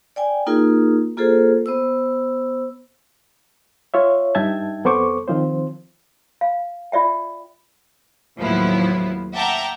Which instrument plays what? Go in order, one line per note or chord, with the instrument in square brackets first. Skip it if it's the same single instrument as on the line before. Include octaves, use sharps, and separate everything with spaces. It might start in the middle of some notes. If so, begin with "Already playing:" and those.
[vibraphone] D5 G5 G#5
A#3 D#4 F4 G#4 A#4
A#3 F4 G#4 A4 C5
B3 C5 E6
[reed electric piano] F4 C#5 E5
G2 D#4 E5 G5 A5 G#6
F2 B3 A4 C5 C#6 D6
D#3 F3 C4 C5
[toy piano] F5
F4 D5 E5 G5
[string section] D#2 A2 F3 F#3 B3 E4
E5 F#5 G5 A5 A#5 D6